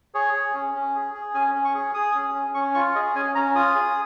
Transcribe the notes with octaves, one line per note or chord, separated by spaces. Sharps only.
G#4 C#5
G#4
C#4
C#4
G#4
G#4
C#4 G#5
C#4
C#6
G#4
G#4 D#6
C#4
C#4
C#4 C#6
F4 C#6
G#4 D#5
C#4 G#5
C#4 A#5
F4 D#6
G#4